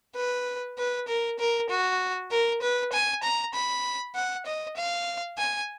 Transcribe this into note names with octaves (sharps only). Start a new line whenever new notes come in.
B4
B4
A#4
A#4
F#4
A#4
B4
G#5
A#5
B5
F#5
D#5
F5
G#5